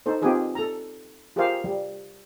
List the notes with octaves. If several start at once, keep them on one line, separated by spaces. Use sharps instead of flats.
D#4 A4 C5
C4 D#4 F4 G4 G#4 B4
A4 A#5
F4 G4 G#4 A#4 C5 F5
G3